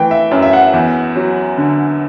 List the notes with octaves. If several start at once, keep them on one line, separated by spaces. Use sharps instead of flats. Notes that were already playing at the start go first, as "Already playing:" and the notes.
Already playing: E3 A3 G5
E5
F#2
E5
F#5
E2
F#3
D3